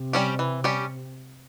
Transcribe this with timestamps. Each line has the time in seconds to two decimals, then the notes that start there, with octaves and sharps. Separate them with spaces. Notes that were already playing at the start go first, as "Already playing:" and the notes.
Already playing: C3
0.13 G3 C#4 G4
0.39 E3
0.64 G3 C#4 G4